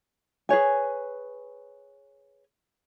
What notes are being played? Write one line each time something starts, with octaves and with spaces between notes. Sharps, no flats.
G#4 B4 C#5 G#5